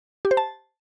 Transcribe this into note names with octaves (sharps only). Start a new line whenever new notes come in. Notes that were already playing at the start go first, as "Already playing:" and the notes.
G4
C5
A5